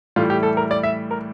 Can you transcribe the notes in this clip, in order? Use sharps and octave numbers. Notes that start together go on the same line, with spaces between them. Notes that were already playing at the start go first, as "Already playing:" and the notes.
A2 E3 G3 F4
G4
A4
A#4
D5
E5
A#4